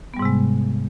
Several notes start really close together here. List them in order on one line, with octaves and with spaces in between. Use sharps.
B3 G3 G#2 C3 G#3